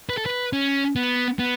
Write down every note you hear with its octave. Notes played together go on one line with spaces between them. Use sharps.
B4
A4
B4
C#4
B3
B3